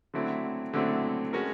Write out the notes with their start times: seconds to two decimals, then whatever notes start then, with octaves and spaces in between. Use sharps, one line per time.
0.14 D3 F#3 A3 C4 E4
0.73 D3 F#3 A3 C4 E4
1.33 G#3 C#4 F#4 A#4